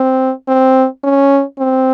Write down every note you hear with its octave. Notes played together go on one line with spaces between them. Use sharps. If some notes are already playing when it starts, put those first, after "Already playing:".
Already playing: C4
C4
C#4
C4